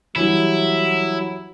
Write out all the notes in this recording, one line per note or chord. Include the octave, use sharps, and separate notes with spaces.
E3 F#3 G3 E4